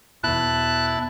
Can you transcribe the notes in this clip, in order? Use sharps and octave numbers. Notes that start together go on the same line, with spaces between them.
E2 B2 E4 A5 F#6